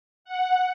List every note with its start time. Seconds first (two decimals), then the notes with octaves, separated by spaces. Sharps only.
0.25 F#5